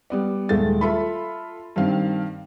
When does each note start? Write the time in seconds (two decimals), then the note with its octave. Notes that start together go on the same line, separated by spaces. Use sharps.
0.10 G3 B3 D5
0.49 D#1 G#3 A3 A6
0.81 F4 A4 E5 B5
1.76 G2 D#3 C4 F5